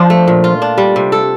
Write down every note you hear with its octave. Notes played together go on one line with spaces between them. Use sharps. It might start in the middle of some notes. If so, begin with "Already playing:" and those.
Already playing: F3 D4 F4
A3
A#2
F4
D4
G3
C3
A4